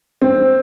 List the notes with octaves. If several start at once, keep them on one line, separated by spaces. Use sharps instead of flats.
C4